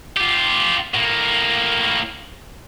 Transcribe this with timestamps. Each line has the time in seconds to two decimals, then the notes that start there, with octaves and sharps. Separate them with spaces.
0.17 F4 G4
0.94 A2 A#3